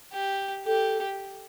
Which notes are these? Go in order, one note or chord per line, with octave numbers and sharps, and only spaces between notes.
G4
G4 A4